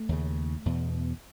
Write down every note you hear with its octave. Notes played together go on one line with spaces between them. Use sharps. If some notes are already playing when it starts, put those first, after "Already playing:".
Already playing: A3
D#2 C#3
E2 B2